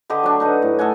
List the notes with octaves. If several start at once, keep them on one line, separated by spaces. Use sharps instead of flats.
D3 G4 D#5 B5
F#3 D4
D#4 B4 F#5
A2
A4 D#5 F#5 G#5